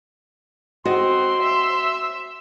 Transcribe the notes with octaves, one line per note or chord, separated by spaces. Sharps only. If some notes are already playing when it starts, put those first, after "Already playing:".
C4 F#4 D#5 C6
E5